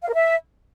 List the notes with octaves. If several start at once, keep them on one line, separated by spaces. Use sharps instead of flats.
F5
A#4
E5